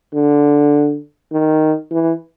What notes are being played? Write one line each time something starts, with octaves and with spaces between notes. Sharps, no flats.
D3
D#3
E3